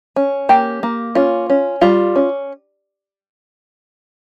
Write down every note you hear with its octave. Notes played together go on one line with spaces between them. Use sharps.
C#4
A#3 G4
A#3
C#4 F4
C#4
G3 F4
C#4